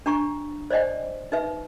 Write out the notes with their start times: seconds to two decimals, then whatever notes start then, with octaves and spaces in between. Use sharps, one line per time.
0.06 D4 G5 A#5 C#6
0.70 C5 D5 D#5 G5 G#5
1.32 D#4 B4 E5